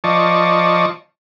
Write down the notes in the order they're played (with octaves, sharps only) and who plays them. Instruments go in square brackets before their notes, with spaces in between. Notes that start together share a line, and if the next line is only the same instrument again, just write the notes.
[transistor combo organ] F3 D5 D#5 A5 C#6